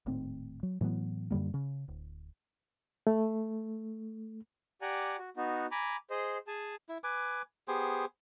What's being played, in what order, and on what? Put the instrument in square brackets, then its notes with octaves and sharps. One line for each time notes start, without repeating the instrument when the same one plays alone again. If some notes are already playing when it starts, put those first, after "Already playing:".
[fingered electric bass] D#1 D#2 A2 C4
F#3
A2 E3 F#3 B3
F#2 D3 G3 A#3
C#3
D1
[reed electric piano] A3
[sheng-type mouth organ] G4 D5 F#5 G#5 A#5
F#4
B3 D#4 F#4
G#5 A#5 B5 D6
G#4 C5 D#5
G#4 G#5 A5
[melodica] E4
B4 G#5 D6
B3 G4 G#4 C5